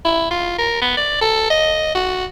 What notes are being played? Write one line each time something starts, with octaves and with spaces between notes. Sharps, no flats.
E4
F4
A#4
B3
D5
A4
D#5
F#4